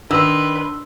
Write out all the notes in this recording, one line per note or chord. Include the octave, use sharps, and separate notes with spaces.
D#3 D4 B4 C6 E6